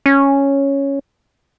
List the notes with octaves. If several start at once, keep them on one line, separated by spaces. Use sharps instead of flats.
C#4